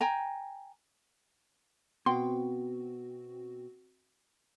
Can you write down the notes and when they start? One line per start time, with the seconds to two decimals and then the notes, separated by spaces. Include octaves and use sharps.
0.01 G5 G#5 A#5
2.06 B2 C4 F#4 F#5 G5 C6